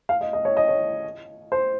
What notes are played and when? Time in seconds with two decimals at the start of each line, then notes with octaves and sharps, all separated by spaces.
0.09 F5
0.21 D#5
0.33 D#5
0.45 C#5
0.57 D#5
0.68 C#5
1.52 C5